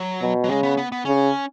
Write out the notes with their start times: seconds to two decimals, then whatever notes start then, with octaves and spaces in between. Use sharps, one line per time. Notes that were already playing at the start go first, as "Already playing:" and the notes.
Already playing: F#3
0.22 B2
0.44 F#3
0.49 C#3 G#3
0.63 B3
0.77 B3
0.92 B3
1.05 C#3 C#4